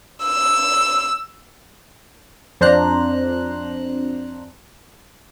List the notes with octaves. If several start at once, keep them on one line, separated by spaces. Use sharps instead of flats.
E6
F2 D4 C5 A#5 F#6